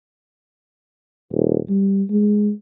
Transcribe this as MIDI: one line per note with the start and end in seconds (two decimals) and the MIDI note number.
1.32 1.58 27
1.69 2.03 55
2.10 2.51 56